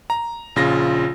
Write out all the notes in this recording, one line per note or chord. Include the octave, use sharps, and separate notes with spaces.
A#5
A#1 C#3 F4 A#6